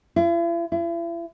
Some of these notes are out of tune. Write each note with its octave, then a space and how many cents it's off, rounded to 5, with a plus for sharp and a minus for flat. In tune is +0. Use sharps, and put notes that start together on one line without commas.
E4 +45
E4 +40